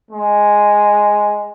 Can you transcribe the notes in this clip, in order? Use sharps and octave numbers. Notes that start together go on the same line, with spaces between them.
G#3